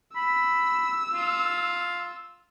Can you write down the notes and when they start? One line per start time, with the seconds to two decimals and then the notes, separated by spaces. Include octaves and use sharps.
0.16 B5 E6
1.14 F4